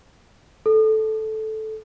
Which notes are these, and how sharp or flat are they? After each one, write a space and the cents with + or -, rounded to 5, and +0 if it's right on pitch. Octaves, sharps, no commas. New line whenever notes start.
A4 -10